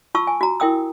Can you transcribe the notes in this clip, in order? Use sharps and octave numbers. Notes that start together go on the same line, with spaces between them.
F4 A5 C#6 E6
G#5
F#4 A#5
E4 A#4 G5 D#6 E6